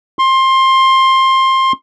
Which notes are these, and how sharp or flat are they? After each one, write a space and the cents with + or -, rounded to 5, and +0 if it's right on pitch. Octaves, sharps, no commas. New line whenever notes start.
C6 +20